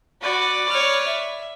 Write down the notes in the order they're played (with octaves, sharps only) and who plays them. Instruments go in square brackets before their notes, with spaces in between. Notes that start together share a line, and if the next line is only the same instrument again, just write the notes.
[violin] F#4 [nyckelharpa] B4 D5
[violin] C#5 F6
E5